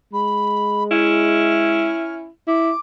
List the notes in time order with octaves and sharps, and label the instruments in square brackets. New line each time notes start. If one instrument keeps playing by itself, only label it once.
[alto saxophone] G#3 [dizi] B5
[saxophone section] C#4 E4 [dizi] F6
[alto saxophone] E4 [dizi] D6